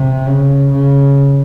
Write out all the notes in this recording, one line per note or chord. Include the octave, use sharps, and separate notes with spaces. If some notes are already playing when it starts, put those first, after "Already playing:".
Already playing: C3
C#3
C#3